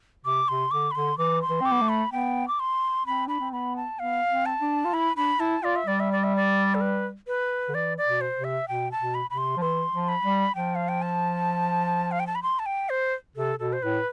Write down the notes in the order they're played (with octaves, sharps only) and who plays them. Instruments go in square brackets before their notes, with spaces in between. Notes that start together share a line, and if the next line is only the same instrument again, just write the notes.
[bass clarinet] C3 [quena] D6
[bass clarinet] C3 [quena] C6
[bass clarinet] D3 [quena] D6
[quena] B5
[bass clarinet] D3 [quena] C6
[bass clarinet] E3 [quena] D6
[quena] C6
[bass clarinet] E3
[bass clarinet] C4 [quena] D6
[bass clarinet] B3
A3
[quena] B5
[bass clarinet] B3 [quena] G5
[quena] D6
C6
[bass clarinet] C4 [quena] B5
[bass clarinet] D4 [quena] B5
[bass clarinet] C4
[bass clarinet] B3 [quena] B5
[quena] A5
[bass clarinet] B3 [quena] F5
[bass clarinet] C4
[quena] A5
[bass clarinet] D4
F4
[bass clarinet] E4 [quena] B5
[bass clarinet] D4 [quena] B5
[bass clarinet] E4 [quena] A5
[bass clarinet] F4 [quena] D5
[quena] E5
[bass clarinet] G3 [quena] D5
[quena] E5
D5
E5
D5
A4
B4
B4
[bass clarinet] D3
[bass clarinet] E3 [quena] D5
[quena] D5
[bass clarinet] B2
[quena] C5
[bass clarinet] C3
[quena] E5
[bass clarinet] B2 [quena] G5
[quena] A5
[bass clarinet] B2
[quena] B5
[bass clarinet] C3 [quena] B5
[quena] C6
[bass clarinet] F3
[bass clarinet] E3 [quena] C6
[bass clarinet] F3
[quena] B5
[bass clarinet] G3
[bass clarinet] F3 [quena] G5
[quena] F5
G5
A5
F5
G5
A5
B5
C6
A5
G5
C5
[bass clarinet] C3 [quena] A4
[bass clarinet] B2 [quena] A4
[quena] C5
[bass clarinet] A2 [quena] B4